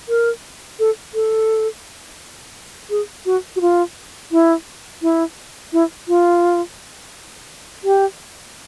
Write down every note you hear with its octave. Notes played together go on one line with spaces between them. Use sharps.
A#4
A4
A4
G#4
F#4
F#4
F4
E4
E4
E4
F4
G4